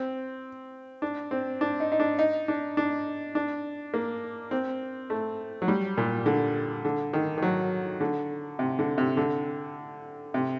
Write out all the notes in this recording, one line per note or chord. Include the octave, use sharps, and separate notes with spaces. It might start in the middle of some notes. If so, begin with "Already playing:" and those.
Already playing: C4
D4
C4
D4
D#4
D#4
D4
D#4
D4
D4
D4
A#3
C4
A3
F#3
G3
A#2
D3
D3
D#3
D#3
F#3
D3
C3
D3
C3
D3
C3